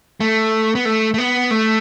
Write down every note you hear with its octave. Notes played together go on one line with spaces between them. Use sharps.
A3
B3
A3
A3
B3
A3